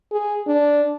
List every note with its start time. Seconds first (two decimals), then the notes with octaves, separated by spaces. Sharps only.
0.12 G#4
0.47 D4